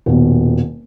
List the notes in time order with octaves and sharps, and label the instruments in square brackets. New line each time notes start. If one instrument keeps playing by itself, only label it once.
[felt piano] D#1 B2